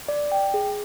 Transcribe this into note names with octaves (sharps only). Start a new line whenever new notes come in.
D5
G5
G#4